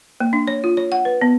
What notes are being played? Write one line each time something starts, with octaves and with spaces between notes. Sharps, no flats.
A#3
D4
C#5
F4
C#5
F#5
B4
B3